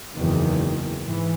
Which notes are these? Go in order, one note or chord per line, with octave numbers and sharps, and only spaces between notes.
F#1 E2 D#3
G#2 E3